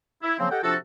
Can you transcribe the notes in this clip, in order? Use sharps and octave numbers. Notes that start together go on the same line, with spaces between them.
E4
C#3 F3 F#3 A#3 C4
G4 A4 D#5 F#5 G5
C3 F3 D4 F4 F#4 A4